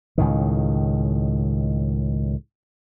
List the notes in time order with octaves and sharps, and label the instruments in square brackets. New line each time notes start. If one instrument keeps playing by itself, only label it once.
[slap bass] C#2 A2 D#3